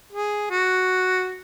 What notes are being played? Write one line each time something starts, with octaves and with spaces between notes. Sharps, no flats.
G#4
F#4